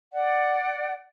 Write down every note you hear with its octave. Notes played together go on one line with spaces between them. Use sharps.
D5 F#5